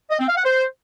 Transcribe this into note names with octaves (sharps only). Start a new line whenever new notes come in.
D#5
C4
F5
F#5
C5